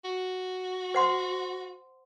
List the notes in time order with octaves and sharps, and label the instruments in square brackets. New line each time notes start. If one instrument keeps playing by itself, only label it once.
[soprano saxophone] F#4
[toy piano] C5 F#5 C6